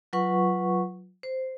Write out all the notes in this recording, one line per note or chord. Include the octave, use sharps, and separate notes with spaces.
F#3 F4 B4 F#5 C#6
C5